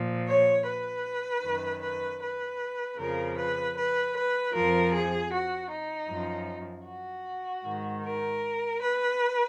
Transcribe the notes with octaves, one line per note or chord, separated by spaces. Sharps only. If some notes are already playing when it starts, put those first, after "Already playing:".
Already playing: A#2 F3
C#5
B4
F#2 D#3
B4
B4
F2 C#3 F3 A#4
B4
B4
B4
F2 F3 A#4
G#4
F#4
D#4
F#2 F3
F#4
G#2 D#3
A#4
B4